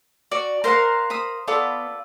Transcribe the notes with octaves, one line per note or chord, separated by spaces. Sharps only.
F#4 D5
A#4 C5 F5 F#5 C6
C5 B5 D#6
B3 F4 A4 D5